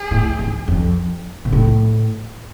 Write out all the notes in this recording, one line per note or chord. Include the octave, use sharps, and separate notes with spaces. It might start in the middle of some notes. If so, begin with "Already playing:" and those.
Already playing: G#4
A2
G#2
F2
B2
A2